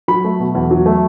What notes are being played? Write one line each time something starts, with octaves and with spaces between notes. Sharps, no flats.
F#3 B5
A3
B2
E2
F#3
A3